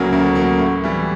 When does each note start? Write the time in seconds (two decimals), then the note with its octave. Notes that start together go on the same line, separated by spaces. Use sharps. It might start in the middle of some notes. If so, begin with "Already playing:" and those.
Already playing: D2 C#3 F#3 A#3
0.12 D2
0.35 C#3 F#3 A#3
0.59 A2
0.84 E3 G3